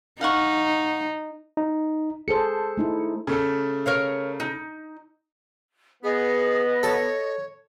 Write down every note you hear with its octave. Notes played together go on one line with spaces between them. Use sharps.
D#4 F5 F#5 C#6
D#4
G#4 A4 C5 C#7
A3 D#4 E4
C#3 A3 A4
A#4 C#5 F5
D#4
B3 G#4 D#5
A4 C#5